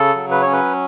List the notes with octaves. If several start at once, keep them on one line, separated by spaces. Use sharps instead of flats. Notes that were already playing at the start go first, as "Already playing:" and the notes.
Already playing: C#3 A4
F#3
B4
C#4 C#5
B4